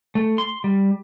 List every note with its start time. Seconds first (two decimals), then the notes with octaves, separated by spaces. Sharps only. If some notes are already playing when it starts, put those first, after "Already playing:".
0.15 A3
0.38 C6
0.64 G3